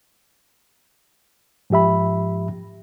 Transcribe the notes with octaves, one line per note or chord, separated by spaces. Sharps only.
G#2 F3 G4 E5 B5